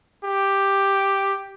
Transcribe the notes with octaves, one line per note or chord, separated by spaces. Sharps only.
G4